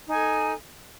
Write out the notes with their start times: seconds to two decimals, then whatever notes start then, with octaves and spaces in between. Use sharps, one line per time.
0.05 D#4
0.10 G#5
0.14 A4